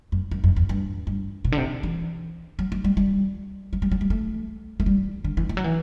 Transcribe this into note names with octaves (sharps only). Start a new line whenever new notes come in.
F#2
F#2
F#2
E2
G2
G2
B2
D3
C3
E3
F#3
F#3
G3
G3
F#3
G3
F#3
G3
A3
A3
G3
D3
E3
E3
F#3
E3